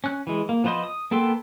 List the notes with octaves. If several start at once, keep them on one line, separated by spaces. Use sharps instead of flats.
C#4 F#6
E3 G#3
A#3
F3 B3 B4 C5 D#5
D#6
A#3 B3 A4 G5 C6